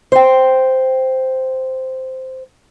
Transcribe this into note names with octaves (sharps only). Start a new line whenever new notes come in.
C5 G5